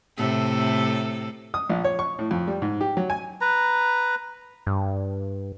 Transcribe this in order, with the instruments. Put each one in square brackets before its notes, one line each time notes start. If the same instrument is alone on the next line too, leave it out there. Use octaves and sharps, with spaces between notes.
[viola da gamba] A2 C3 A4
[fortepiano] D#6
A#1
C#5
C#6
A2
F2
G3
G#2
G4
F#3
G#5
[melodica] B4 A#5
[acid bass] G2